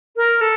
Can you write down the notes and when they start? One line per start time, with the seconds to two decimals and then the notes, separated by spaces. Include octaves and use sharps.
0.16 A#4
0.41 A4